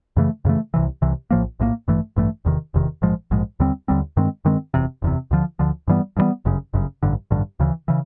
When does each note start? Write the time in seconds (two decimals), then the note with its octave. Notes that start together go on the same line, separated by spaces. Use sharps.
0.17 F#2 C#3 E3 A3
0.45 F#2 C#3 E3 A3
0.74 C2 C3 E3
1.02 C2 C3 E3
1.31 A#1 A2 F3 A#3
1.60 A#1 A2 F3 A#3
1.88 A1 G2 E3 A3
2.16 A1 G2 E3 A3
2.45 F1 E2 C3 D#3
2.74 F1 E2 C3 D#3
3.02 A#1 G#2 F3 G#3
3.31 A#1 G#2 F3 G#3
3.60 D#2 D3 G3 C4
3.88 D#2 D3 G3 C4
4.17 G2 D#3 G#3 C4
4.45 G2 D#3 G#3 C4
4.74 F#1 E2 C3
5.02 F#1 E2 C3
5.31 D2 D3 F3
5.59 D2 D3 F3
5.88 G2 E3 G3 B3
6.17 G2 E3 G3 B3
6.45 G1 F#2 C#3
6.74 G1 F#2 C#3
7.03 A1 G2 D3
7.31 A1 G2 D3
7.60 D2 C#3 E3
7.88 C#3 E3